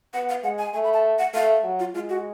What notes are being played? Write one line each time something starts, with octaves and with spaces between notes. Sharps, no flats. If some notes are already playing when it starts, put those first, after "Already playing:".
B3 F#5
F5
G#3 F#5
G#5
A3 G#5
B5
A5
F#5
A3 F5
F#3
F4
G#3 F4
F#4